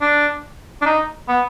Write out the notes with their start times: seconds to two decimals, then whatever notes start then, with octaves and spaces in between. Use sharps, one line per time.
0.01 D4
0.82 D4
0.86 D#4
1.28 B3